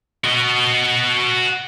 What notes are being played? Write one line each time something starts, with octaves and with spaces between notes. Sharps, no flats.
F#4 D#5